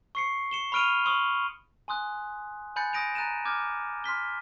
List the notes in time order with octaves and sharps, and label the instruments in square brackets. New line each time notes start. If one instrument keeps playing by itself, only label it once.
[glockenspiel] C#6 C7 C#7
C#7 E7 G7
B5 C#6 F6 D7 D#7 F7
C6 C#6 D#6
G#5 C6 D#6 F#6
G#5 B5 F#6 G6 A6 C#7
D#6 G6 A#6 D7 D#7 F7
A#5 F#6 A6 D#7 E7
D6 F6 G6 G#6
C6 F6 B6 G7